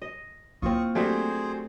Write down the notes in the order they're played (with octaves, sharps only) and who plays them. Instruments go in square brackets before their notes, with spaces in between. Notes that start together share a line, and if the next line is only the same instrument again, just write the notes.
[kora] D#5
[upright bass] A#3 E4 [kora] C4 F4 [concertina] C#6 D#6
[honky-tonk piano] F#3 C4 G4 [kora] A3 D4 [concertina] G#4 C5